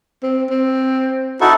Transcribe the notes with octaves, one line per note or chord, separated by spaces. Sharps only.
C4
C4
D#4 E4 F#4 A4